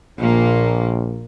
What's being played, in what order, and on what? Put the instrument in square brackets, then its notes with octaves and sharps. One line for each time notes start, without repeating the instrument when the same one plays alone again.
[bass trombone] A#1 [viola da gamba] A#2 A#3